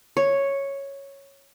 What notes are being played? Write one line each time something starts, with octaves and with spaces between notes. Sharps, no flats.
C#5